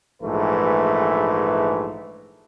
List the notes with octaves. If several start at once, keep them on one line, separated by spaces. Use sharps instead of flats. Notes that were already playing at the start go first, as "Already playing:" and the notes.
A#1 G#2 E3 A3 B4